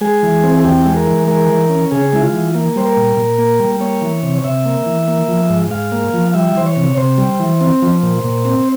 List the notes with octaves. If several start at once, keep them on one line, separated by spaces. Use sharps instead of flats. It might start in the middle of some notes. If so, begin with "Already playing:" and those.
G#3 G#4
E3
C4
G#4
E2 G4
G#3
A#4
E3
G#3 A#4
E3
C#4
C#3 G#4
G#3 E4
F4
E3
A#3
G3 C5
A#4
A#2
A#2
A#3
G3
A#3 C#5
E3
C3
C#5
C3 E5
A#3
E3
A#3
F3
G#2
G#2 F5
A#3
F3
G3 E5
E3 C5
C#5
C3
C3 C5
G3
E3
C4
F3
A#2
A#2
C4